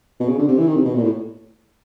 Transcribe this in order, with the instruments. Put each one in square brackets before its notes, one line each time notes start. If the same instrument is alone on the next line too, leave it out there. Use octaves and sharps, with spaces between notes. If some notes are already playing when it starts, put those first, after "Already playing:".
[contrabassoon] B2
C#3
D3
C3
E3
D#3
C3
B2
A#2
A2